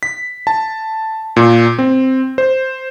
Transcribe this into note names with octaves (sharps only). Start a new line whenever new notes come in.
B6
A5
A#2
C4
C5